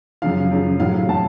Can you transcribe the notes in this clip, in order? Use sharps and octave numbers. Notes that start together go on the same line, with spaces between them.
F#2 C#3 F3 F5
F#2 C#3 F3
A2 F#3 F5
A2 F#3 A5